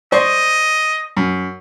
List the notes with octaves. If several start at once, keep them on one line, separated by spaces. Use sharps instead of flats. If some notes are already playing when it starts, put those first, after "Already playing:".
C5 D5 D#5 C#6
F#2